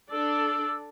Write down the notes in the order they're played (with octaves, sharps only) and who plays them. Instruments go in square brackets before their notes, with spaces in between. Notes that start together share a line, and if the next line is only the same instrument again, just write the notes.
[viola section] D4 A4 D5 [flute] E6